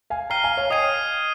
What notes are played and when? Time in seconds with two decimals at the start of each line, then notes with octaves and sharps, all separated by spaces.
0.10 F5 G#5
0.30 G5 A#5 F6 C7 D#7 G7
0.44 F5 G#5
0.57 C#5 F5
0.70 D#5 G5 D#6 G#6 C7 D#7